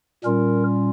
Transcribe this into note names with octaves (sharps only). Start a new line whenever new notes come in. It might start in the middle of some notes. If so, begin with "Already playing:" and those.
A#2 G3 C#4 F4 A#4